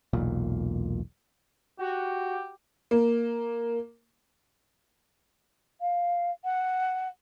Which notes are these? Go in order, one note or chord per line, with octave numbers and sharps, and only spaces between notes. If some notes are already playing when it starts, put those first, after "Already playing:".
E1 B1 A#2
F#4 G4
A#3
F5
F#5